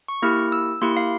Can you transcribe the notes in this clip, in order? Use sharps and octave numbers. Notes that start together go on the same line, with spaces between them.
C#6
A#3 E4 G4 F6
E6
A#3 E4 G4 C6
F5